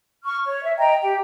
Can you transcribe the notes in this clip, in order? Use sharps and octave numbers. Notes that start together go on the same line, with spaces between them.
C#6 F6
C#5
E5
D#5 G5 A#5
G4 G5